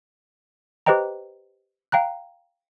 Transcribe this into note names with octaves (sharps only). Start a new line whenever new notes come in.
G4 B4 C5 D#5 G5 A#5
F5 G5 A#5 F#6